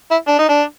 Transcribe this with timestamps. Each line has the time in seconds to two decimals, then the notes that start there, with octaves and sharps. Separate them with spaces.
0.11 E4
0.28 D4
0.38 D#4
0.49 D4